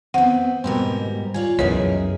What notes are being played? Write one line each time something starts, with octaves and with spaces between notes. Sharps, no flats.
B3 C4 F#5
G#2 B2 G3 B3 C4 A#4
F4 C#5 D5 G#5
C#2 F#2 B2 E3 G#3 G#4 A#4 C#5